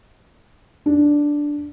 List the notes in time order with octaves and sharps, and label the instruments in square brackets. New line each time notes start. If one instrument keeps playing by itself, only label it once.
[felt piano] D4